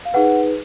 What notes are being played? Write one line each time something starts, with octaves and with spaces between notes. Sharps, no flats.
F5
D#4 G#4 B4 F#5